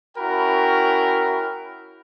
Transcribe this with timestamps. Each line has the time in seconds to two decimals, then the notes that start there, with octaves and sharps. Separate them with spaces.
0.17 C#4 E4 F#4 A#4 G5 B5